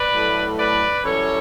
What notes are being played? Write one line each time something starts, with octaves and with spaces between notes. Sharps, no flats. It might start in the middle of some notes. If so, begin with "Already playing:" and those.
Already playing: B4 D5
A2 F#3 A3
B4 D5
F#2 E3 G3 A4 C#5